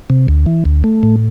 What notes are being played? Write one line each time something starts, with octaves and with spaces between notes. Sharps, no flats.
C3
D2
E3
D2
A3
A2